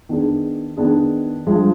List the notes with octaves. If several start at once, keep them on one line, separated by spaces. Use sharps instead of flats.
D#3 B3 D4 G#4
D#3 B3 D4 G#4
G2 F3 G#3